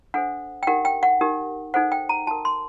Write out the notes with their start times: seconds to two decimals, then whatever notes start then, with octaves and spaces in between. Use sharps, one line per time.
0.14 D4 A4 C5 F#5
0.63 G5
0.67 D#4 G4 A#4 F#5
0.85 G5
1.03 F#5
1.21 D#4 G4 A#4
1.74 D#4 A4 C5 F#5
1.92 G5
2.09 A#5
2.27 F#4 A#4 A5
2.45 C6